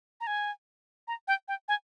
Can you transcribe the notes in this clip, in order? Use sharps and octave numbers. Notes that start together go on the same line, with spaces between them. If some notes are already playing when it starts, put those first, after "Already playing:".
A#5
G#5
A#5
G5
G5
G#5